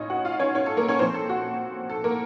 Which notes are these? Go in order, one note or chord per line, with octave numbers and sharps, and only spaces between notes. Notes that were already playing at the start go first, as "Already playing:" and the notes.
Already playing: A2 C#4 D#4 F4 C#5 D#5
F#4 F#5
F4 F5
C#4 C#5
C#4 C#5
A4
A#3 A#4
C#4 C#5
A#2 F3 C4 C5
A4
F#4
A4
A#3 A#4